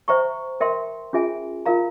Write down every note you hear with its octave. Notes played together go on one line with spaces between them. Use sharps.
C5 E5 G5 A#5 C#6
A#4 E5 G5 C6
C#4 F4 G#4 E5 G#5
F4 A#4 F5 A#5